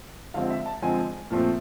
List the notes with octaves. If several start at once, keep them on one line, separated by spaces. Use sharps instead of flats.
D3 F3 G#3 C4 F5
E5
A5
D3 F3 G#3 C4 G#5
A#2 F3 A3 C4